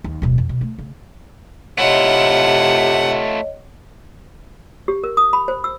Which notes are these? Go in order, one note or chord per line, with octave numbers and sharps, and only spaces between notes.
D#2
D1 B2
F2
B2
A3
C#3
C3 A3 E4 F4 C#5 D#5 F#5
G4
A#4
D#6
B5
C5
E6